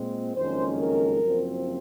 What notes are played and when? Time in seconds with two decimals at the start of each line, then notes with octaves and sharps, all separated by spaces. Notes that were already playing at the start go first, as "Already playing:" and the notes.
Already playing: A#2 G#3 C4
0.35 F#1 F2 D#3 G#3 C#4 C5
0.79 A#4
1.22 F#1 F#2 F3 C4